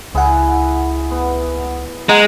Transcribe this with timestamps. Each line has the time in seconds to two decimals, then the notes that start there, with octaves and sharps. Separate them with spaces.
0.15 C#2 E4 G#4 F#5
1.11 B3
2.09 G#3 F#5 A#5